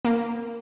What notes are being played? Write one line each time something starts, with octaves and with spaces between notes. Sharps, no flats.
A#3